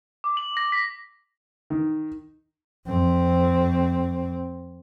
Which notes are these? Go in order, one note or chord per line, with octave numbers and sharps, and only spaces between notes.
D6
F#7
A#6
B6
D#3
F2 C4